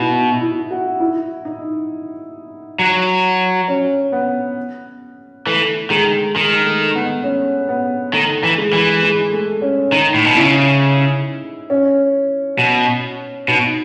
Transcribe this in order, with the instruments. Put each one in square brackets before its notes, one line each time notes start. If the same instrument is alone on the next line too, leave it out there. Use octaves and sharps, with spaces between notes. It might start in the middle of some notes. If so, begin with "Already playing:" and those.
Already playing: [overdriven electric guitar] B2 [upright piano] D#4 E4
[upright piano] E4
F#4
E4
D#4
[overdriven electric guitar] F#3
[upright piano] C#4
B3
[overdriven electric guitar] E3 [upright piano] A3
[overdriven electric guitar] D#3 [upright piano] G#3
[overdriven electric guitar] D#3 [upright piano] G#3
[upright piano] A3
B3
C#4
B3
[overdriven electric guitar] D#3 [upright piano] A3
[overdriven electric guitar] E3
[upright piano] G#3
[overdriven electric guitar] E3
[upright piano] G#3
A3
C#4
[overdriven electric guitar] D#3 [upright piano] D#4
[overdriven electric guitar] A2
B2
[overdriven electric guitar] C#3 [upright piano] E4
[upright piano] C#4
[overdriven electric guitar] B2
[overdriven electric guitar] B2 [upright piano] D#4